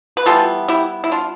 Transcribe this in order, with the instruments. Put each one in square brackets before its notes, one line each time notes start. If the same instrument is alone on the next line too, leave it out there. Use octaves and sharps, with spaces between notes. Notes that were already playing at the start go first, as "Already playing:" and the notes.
[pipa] B4
E3 G3 B3 F4 A4
E4 G4
E4
D4 F4